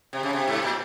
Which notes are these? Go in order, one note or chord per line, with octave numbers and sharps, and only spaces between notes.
C3
C#3
C3
G#2
A#2